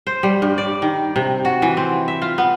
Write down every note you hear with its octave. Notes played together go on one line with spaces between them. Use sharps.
C5
G3
G2
D5
D#3
C3
F#4
E3
C4
E5
F4
B3